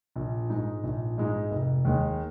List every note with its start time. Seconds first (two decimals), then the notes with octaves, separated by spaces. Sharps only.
0.16 A#1
0.50 G#2 G#3 D#4
0.83 A#1
1.18 G#2 G#3 D#4
1.51 F1
1.85 D#2 D#3 G#3